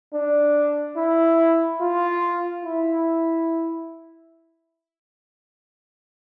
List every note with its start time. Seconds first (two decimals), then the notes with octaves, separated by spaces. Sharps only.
0.14 D4
0.97 E4
1.81 F4
2.65 E4